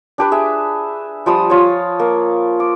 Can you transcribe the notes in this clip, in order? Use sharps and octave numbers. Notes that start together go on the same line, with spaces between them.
D4 G4 B4
G#4 E5
F3 G3 D#6 E6
F4 C#5
A#3
D6